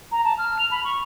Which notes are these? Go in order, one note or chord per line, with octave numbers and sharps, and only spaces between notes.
A#5
A5
F6
F7
B5
C#6